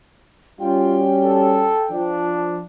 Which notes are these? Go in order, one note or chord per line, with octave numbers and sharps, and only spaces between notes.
G3 C#4 F4 F#4 G5
A4
F3 D4